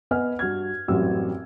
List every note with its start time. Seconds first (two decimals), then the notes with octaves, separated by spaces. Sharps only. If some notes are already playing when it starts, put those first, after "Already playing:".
0.11 B3 B4 D#5 F#5 G#5 F6
0.39 G2 F#4 F6 G#6
0.88 A1 F#2 G3 C4 F#4 E6